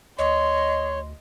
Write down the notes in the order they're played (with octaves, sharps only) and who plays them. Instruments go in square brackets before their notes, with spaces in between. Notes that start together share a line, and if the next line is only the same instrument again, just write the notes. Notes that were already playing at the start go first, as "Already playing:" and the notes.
[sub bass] D2 [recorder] C#5 [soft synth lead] D#5 [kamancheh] C6